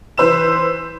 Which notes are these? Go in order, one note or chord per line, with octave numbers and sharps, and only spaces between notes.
E3 B4 C5 E6 E7